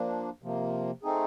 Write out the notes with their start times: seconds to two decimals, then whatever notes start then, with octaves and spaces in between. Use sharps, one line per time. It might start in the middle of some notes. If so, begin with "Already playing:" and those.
Already playing: F3 A#3 D4
0.42 C3 F3 A#3
1.03 A3 C4 D#4 G#4